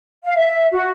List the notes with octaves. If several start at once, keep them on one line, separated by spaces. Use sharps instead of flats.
F5
E5
F#4